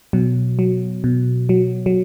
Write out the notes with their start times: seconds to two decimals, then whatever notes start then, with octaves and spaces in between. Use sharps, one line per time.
0.13 B2 F#3
0.59 F#3
1.04 B2
1.49 F#3
1.86 F#3